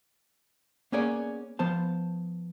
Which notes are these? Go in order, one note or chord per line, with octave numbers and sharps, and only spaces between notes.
A#3 B3 C#4 G#4 C#5 D5
F3 B3 C5 A5